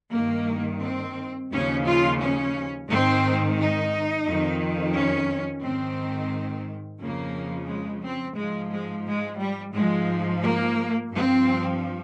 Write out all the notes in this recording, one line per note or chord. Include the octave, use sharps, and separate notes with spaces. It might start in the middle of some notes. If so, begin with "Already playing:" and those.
G2 D#3 A#3
C4
D#2 C#3 F3 C#4
F4
C#4
G#2 D#3 C4
D#4
F2 D#3
C#4
G#2 D#3 C4
F2 C#3 F3 A#3
G#3
C4
G#2 F3 G#3
G#3
G#3
G3
G#2 F3 G#3
A#3
G2 F3 C4